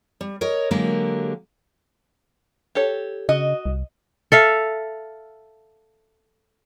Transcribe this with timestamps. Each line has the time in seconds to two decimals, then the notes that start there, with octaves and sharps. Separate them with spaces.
0.21 G3
0.41 A#4 C#5 D#5
0.71 D3 F#3 G#3 A#3 G4 A#4
2.75 G4 A4 C#5
3.29 C#3 F#4 D#5
3.66 C2
4.32 A4 E5 F5